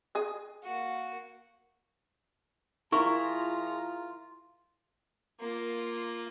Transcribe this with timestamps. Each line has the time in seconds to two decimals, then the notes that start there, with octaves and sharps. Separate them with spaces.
0.15 G#4 D#5
0.63 A#3 F#4
2.92 F3 E4 F4 G#4 A#4 A#5 C#6
5.40 A#3 F4